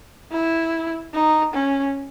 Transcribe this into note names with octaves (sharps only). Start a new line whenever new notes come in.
E4
D#4
C#4